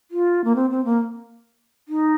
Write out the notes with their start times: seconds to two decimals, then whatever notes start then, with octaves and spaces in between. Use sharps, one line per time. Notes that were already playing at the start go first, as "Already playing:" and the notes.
0.11 F4
0.44 A#3
0.56 C4
0.70 C4
0.85 A#3
1.88 D#4